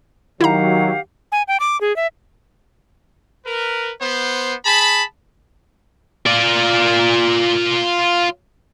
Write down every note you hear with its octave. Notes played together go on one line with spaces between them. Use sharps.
D#3 F#3 E4 G4 F5 F#5 A#5
G#5
G5
D6
G#4
E5
A#4 B4
B3 C5
G#4 A5 B5
F4 D5